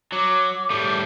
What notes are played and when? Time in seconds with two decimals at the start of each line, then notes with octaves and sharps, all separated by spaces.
0.13 F#3 D6
0.71 A2 G3